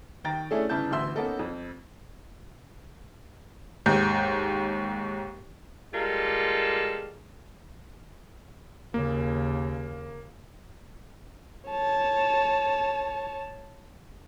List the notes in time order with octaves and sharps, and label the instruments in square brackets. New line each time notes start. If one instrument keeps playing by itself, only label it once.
[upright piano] D#2 D#3 G5 A#5 A6
A3 C#4 D4 E4 G#4 A4
G1 C#3 E4 A5 G6
A1 D2 E5 C6 E6
A#3 B3 C#4 D#4 A4 A#4
F2
[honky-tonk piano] D#2 G#2 G6
[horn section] G3 G#3 A#3 F4 A4
[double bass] D#2 C#3 [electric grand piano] A#3
[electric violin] C#5 A5